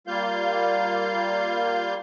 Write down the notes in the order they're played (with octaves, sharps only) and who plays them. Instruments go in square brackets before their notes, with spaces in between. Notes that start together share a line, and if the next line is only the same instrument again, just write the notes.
[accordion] G3 A#3 F4 F5 G6